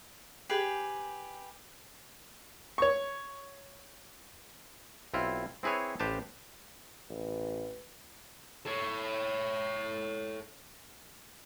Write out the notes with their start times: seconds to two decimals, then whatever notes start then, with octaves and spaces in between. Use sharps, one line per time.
0.49 G4 G#4 B4
2.78 C#5 C#6
5.14 B1 C4 E4 F4
5.63 C4 E4 G#4 B4 C#5
6.00 A1 G4 B4 C5 A5
7.09 A1 B4
8.65 A4 C#5